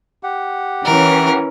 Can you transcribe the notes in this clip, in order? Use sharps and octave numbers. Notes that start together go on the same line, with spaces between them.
G4 F#5
E3 C#4 A#4